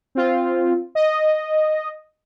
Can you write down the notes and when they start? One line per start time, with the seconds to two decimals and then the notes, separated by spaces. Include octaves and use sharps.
0.15 C4 F4
0.95 D#5